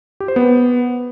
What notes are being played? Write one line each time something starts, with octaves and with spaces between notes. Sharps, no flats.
G4
C5
B3